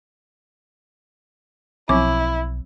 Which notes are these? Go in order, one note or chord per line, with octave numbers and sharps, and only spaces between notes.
B1 F3 C4 E4 D6